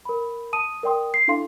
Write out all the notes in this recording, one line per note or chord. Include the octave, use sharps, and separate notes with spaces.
A#4 B5
A5 D#6 D#7
A#4 D5 G5 C6 D#6
C7
D4 E4 A4 F5 C6